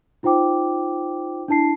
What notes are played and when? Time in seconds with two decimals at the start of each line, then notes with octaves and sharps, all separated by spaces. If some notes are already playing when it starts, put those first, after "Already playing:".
0.23 D#4 F4 C5 G5 D6
1.48 D4 E4 A5 C7